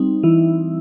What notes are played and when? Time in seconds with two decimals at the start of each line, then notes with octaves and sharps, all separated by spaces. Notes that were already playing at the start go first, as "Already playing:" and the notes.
Already playing: G3 C4 D#4
0.23 E3 E4